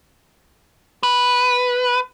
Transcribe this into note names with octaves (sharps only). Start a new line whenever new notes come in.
B4